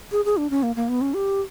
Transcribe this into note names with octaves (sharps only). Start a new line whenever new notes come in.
G#4
G#4
D4
C#4
A#3
A#3
B3
C#4
G4